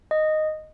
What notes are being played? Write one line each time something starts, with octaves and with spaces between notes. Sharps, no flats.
D#5